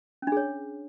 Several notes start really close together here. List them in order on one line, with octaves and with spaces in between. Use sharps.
C#4 D4 G#4 C#5